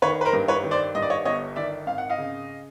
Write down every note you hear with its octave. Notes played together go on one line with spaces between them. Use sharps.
D#3 B4 C#5
B4
A#4 C5
G2
B4 C#5
D#3
C5 D5
G2 D#5
D5
C#5 D#5
G1 C#5 D#5
D#3 D5 E5
G#1 F5
F#5
D#5 F5
C#3